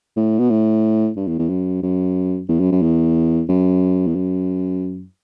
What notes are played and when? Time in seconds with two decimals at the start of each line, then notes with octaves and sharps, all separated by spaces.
0.16 A2
0.39 B2
0.50 A2
1.16 G2
1.27 E2
1.39 E2
1.49 F#2
1.82 F#2
2.49 E2
2.60 F#2
2.72 F#2
2.82 E2
3.49 F#2
4.07 E2
4.15 F#2